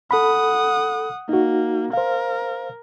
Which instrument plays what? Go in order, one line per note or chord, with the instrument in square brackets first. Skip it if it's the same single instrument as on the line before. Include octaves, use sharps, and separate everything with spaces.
[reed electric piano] A4 B5 [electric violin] F#5 D#6
[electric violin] A#3 [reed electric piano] D#4 F#4
[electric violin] A#4 [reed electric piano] C5 F5